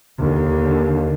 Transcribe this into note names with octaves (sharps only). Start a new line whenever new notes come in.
D#2 D3